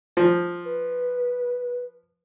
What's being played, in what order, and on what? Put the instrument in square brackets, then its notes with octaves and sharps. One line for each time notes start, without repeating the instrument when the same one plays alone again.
[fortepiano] F3
[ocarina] B4